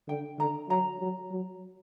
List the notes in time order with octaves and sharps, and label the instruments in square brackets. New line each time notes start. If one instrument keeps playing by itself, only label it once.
[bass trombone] D3 [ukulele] G5
[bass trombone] D3 [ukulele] A#5
[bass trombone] F#3 [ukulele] A#5
[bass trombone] F#3
F#3